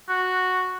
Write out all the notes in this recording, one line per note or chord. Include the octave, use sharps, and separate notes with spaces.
F#4